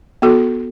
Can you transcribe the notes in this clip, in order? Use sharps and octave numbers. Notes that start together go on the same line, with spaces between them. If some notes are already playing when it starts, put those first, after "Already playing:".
B3 F#4 A4